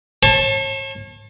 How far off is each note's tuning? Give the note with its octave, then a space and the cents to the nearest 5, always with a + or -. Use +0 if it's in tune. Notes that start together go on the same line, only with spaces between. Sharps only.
C#5 -40 A5 +0